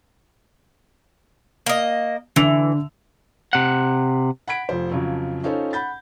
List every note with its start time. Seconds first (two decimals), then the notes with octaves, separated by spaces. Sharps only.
1.66 A#3 D#5
2.36 D3 E3 E6 F7
3.53 C3 F#5
4.48 F#5 B5 G#6 B6 D7
4.69 F1 F3 C5
4.91 F2 C#3 F3 F#3
5.43 C#4 D#4 F4 A4 C5 C#5
5.73 F#5 B5 G6 A6